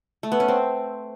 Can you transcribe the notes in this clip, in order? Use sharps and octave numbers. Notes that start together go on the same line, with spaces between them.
A3
B3
C#4
C4